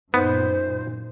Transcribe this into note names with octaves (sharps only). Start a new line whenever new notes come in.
F#2 A#2 A#3 B3 D#4 C5